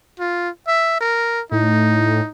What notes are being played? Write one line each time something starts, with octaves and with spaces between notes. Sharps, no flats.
F4
E5
A#4
A2 D#4